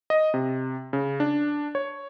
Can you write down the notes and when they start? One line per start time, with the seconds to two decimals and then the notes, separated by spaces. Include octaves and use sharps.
0.10 D#5
0.34 C3
0.93 C#3
1.20 D4
1.75 C#5